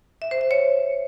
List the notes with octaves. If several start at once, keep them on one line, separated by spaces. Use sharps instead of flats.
E5
C5
E5
C#5